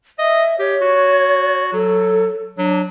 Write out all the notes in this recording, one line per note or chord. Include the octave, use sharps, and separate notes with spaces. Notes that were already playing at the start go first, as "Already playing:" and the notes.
D#5 E5
G4 C#5
F#4
F#3 A4
F#3 D4